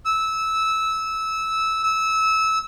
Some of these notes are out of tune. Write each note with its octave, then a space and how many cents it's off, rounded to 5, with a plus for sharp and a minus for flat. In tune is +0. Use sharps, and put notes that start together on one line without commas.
E6 -15
E6 -20